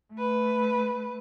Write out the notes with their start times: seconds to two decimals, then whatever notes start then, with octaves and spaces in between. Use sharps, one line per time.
0.14 A3 B4